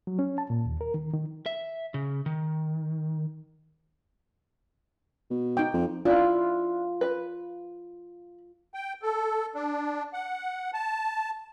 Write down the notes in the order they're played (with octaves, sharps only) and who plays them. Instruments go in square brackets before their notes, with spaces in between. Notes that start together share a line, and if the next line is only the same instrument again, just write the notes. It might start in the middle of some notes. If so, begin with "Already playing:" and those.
[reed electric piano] F#3
C#4
A5
A#2
D#2
A#4
D#3
D#3
[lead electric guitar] E5
C#3
D#3
[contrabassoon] B2
[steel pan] D#4 G5
[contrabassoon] F2
[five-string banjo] D4 E4 [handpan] F4
[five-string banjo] B4
[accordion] G5
A4
D4
F#5
A5